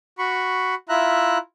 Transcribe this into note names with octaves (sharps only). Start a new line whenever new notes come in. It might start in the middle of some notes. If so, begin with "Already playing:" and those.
F#4 B5 C#6
E4 F4 E5 A#5 F#6